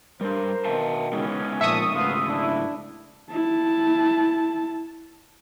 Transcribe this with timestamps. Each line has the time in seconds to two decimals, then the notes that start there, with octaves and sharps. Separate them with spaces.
0.21 G3 D4 A#4 C5
0.65 B2 D#3 E5 F5 A5
1.13 C#3 E3 G#3 B3 C#4 D#4
1.61 A#2 F3 E5 A5 C#6 D#6
1.95 A#1 G#2 C#3 A3 B3 F4 F5
2.27 D4 E4
3.32 E4 A5